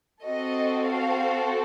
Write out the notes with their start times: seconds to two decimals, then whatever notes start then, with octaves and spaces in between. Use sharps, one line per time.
0.23 C4 F#4 A4 D#5
0.87 F5